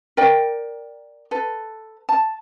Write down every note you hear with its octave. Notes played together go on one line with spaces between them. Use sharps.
A#4 D5 G5
A4 B4
A5